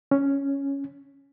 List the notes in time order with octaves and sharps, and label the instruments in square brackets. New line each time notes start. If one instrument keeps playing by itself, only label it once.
[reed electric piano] C#4